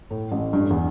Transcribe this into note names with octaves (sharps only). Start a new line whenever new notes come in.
A2
A1
G2
E2